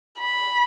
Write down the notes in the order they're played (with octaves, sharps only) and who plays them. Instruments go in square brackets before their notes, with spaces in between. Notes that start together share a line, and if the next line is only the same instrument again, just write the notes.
[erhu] B5